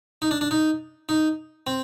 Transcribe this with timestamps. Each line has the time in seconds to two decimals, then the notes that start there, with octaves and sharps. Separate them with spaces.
0.22 D#4
0.31 D4
0.41 D4
0.51 D#4
1.09 D#4
1.67 C4